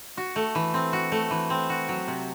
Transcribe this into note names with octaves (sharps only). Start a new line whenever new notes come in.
F#4
A3
E3
C4
F#4
A3
E3
C4
F#4
F#3
C3